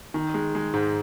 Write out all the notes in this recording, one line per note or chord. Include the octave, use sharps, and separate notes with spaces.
D#3
G#3
G#3
G#2